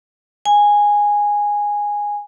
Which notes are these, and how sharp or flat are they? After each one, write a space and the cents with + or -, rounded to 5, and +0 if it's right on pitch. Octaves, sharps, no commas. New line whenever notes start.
G#5 -10